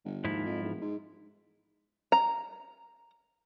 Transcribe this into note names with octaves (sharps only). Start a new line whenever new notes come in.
G1
D#2 G#2 F3 E4
F2
E1
G#2
A#5